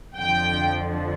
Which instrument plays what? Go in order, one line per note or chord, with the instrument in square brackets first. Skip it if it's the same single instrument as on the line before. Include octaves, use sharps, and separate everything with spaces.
[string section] F2 D3 F3 G5